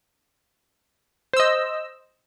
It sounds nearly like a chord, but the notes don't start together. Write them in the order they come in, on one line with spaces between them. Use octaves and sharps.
C5 E6 D#5